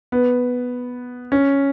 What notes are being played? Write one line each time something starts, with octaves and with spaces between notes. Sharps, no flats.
B3
C#4